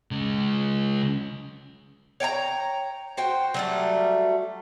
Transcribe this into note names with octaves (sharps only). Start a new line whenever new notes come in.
C#3 G#3
C#5 G5 G#5 A#5
F#4 C5 G5
F#3 G3 A3